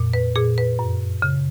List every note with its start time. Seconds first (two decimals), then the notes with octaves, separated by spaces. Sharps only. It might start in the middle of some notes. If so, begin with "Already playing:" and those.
Already playing: F2 A#2
0.13 B4
0.36 A#2 G#4
0.58 B4
0.79 F#2
1.22 C#3